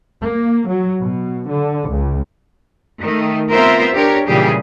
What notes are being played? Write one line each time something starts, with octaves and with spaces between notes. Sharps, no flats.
A#3
F#3
B2
D3
C#2
D#3 A3
B3 C4 F4 A#4 C5 E5
D4 G4 A#4 C#5
A#2 C#3 E3 G3 G4 G#4